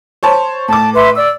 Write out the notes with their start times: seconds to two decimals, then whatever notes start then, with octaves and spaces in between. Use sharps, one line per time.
0.23 C5 C#5 A5
0.68 A2 A5 D6
0.94 B4 E5 C6
1.15 D5 E6